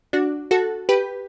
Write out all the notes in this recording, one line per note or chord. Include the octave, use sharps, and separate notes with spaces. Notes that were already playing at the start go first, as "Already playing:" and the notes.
D4 F#4
F#4 A4
G4 B4